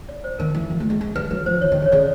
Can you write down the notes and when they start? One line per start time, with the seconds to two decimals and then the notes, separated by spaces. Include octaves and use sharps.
0.09 D5
0.24 C5
0.39 D#3 A#4
0.55 E3
0.70 F3
0.80 A3
0.90 G#3
1.01 G#3
1.16 G3 B4
1.31 F#3 B4
1.46 F3 C5
1.61 E3 C#5
1.72 D#3
1.82 D3
1.86 C#5
1.92 C#3 D5